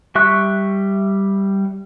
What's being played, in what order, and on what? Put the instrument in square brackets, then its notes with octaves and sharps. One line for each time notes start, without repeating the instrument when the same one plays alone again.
[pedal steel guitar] G3 E5 C#6 F#6